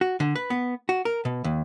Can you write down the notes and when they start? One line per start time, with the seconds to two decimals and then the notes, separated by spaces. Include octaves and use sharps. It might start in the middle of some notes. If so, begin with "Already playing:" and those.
0.01 F#4
0.20 D3
0.35 B4
0.50 B3
0.89 F#4
1.05 A#4
1.25 B2
1.44 D#2